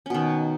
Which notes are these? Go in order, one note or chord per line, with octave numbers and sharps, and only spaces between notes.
B2 D#3 C#4